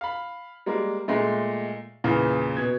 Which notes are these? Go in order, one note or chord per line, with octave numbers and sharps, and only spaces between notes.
F5 B5
G3 G#3 A#3
A#2 G#3 A3
E2 A#2 C#3 E3
B2 G#6